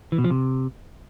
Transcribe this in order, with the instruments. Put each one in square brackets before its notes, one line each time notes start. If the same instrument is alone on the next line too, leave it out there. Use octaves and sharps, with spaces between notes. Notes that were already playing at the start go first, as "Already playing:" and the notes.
[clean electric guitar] E3
B2
F3
C3